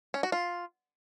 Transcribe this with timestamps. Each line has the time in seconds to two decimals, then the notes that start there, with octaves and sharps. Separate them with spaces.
0.14 C#4
0.23 F#4
0.32 F4